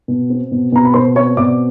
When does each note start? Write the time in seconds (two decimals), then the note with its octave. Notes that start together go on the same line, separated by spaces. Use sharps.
0.08 B2
0.30 C4
0.52 B2
0.72 B2 A#5
0.85 B5
0.94 B2 C5 C6
1.16 C4 C#5 C#6
1.37 B2 D5 D6